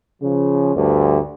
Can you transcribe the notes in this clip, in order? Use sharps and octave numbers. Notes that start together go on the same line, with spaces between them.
C#3 F3
D2 G2